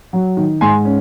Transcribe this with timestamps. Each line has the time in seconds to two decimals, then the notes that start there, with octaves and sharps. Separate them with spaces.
0.13 F#3
0.37 D#3
0.61 G#2 G#5 C6
0.85 C#4